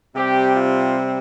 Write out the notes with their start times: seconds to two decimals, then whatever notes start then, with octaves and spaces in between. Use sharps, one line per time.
0.14 C3 G3 C4 G4
0.54 F4